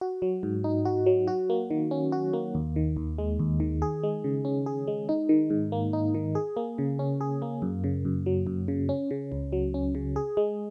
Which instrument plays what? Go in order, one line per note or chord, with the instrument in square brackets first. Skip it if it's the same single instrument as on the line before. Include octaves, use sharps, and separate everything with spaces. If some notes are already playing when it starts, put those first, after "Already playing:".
[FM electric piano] F#4
F#3
G#2
D#4
F#4
F#3
F#4
A#3
D#3
C#4
F#4
A#3
D#2
D#3
D#2
G#3
D#2
D#3
G#4
G#3
C#3
C#4
G#4
G#3
D#4
D#3
G#2
A#3
D#4
D#3
G#4
A#3
C#3
C#4
G#4
A#3
F#2
C#3
F#2
F#3
F#2
C#3
C#4
C#3
C#2
F#3
C#4
C#3
G#4
G#3